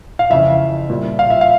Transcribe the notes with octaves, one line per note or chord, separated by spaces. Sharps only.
F5
F2 C#3 E3 E5
A#2 G3
F5
E5
F5